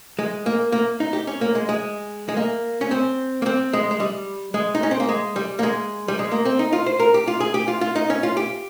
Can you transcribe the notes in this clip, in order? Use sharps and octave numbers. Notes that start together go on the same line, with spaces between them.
G#3
A#3
A#3
D#4
G4
C#4
A#3
G#3
G#3
G#3
A#3
C#4
C4
A#3
C4
G#3
G#3
G3
G#3
D#4
C#4
C4
A#3
G#3
G3
A#3
G#3
G3
G#3
A#3
C4
D#4
F4
C5
A#4
G4
F4
G#4
G4
F4
F4
D#4
C#4
F4
G4